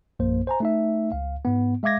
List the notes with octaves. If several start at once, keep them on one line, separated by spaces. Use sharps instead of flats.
A#1 F#2 A#3 C5
C5 G#5 A#5
A3 D#4 E5
C#2 F5
G#2 B3
G#3 E5 F5 D6 G#6 A#6